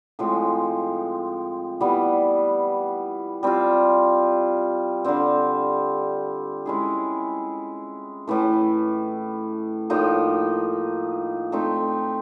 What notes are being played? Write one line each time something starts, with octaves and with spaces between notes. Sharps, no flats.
A2 F3 G#3 C4
E3 G3 B3
G3 C4 F4
D3 G3 C4
G#3 C#4 E4 G#4
A2 E3 A3
A2 F3 A#3 D#4
A3 C4 D#4